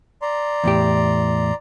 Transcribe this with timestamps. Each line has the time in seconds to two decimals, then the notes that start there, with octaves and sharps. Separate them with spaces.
0.22 D5 A#5 C6
0.64 E2 A2 G4